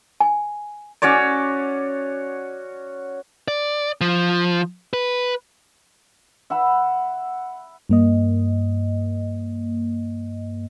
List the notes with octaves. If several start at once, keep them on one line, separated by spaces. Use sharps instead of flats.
G#5
C#4 F#4 C#5 D5
D5
F3
B4
E5 F#5 B5
G2 A#3 D#5